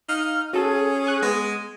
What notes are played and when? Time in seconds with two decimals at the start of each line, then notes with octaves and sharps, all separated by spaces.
0.09 D#4 F5 F6
0.53 C#4 F#4 G#4 A4
1.07 C#6 F#6
1.22 G#3 B3